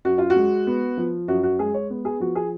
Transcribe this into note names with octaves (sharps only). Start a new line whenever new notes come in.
F#2 F#4
F4
F#4
G#3
B3
F3
F#2 F#4
F#4
G#3 G#4
C#5
B3
G#4
F3 F#4
G#4